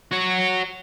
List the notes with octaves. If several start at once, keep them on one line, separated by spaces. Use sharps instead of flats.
F#4 C#5